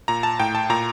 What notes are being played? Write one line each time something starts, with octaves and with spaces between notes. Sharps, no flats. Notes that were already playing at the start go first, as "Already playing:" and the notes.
A#2 A#5
A5
A2 G5
A5
A#2 A#5